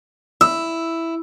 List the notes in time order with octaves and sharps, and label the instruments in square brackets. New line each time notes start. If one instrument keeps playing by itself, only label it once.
[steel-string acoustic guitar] E4 [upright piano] E6